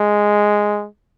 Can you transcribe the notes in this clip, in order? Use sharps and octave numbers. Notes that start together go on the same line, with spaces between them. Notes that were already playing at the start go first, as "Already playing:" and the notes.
Already playing: G#3